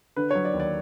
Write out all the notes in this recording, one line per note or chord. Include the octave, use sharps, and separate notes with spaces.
D3 B4
F#3 C#5
D5
D#2
D5